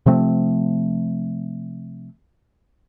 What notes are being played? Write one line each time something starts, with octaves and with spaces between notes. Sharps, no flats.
C3 F3 A3 C4